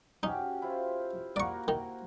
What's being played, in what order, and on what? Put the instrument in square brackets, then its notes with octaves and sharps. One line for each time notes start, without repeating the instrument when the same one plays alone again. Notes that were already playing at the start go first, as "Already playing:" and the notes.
[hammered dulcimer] C#4 F#4 G4 [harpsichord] D#4
[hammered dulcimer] E4 F4 C5
[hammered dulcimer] A#3 F#4 [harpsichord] D5 C#6
[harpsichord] D#3